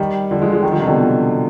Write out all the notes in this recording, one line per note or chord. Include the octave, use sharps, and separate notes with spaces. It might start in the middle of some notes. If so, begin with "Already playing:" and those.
Already playing: D#3 G3
D3 F3
F3 G#3
F3 G#3
D#3 G3
D3 F3
C3 D#3
B2 D3